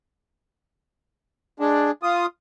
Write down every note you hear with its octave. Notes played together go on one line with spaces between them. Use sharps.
G#3 D4
F4 D#6